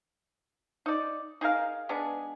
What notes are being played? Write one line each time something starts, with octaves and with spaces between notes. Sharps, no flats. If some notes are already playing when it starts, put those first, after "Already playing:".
D#4 D5
D#4 G#4 A#4 F5
G#3 B3 D4 G#4